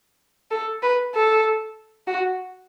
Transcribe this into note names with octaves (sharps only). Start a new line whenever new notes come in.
A4
B4
A4
F#4